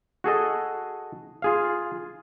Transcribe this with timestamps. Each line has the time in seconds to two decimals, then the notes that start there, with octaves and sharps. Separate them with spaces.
0.24 F#4 G#4 A4 D#5
1.42 F4 G#4 F5